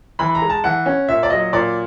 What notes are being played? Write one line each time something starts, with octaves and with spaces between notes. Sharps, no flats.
E3 B5
A#5
G#3
A5
E3 F#5
C#4
A#2 E5
D5
F#3 D#5
A#2 D5